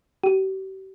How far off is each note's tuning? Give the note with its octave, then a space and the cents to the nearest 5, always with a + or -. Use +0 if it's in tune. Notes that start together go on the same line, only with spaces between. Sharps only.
G4 -40